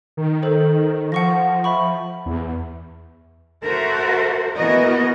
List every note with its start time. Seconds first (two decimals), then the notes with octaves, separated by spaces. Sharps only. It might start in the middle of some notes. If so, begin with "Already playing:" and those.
0.17 D#3
0.43 A4 C5
1.12 F3 F#5 C#6 A#6
1.64 E5 B5 C#6
2.26 E2
3.63 F#4 A4 A#4 C5 E5
4.55 E3 B3 F#4 A#4 D#5